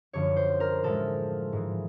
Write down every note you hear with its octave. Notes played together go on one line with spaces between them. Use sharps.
F#2 D3 F3 C#5
C5
A#4
A2 F3 G#3 A4
G#2 E3 G#3